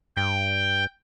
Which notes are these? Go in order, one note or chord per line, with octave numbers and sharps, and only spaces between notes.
G2 G5